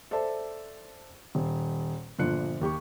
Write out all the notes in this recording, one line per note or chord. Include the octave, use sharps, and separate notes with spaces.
A4 C5 D5 E5 A5
D#1
G1 A#2 F3 D4 F#6 C#7
D#2 G4 C#6